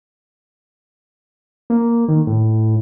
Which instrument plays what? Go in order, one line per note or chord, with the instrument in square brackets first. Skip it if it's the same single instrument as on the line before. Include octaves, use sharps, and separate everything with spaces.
[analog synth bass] A#3
D#3
A2